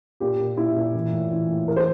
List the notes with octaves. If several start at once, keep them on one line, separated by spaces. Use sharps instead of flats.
A#2 G4
A#2
A#2 E4
A#2
E3
A2
E3
A2
E3 A#4
C5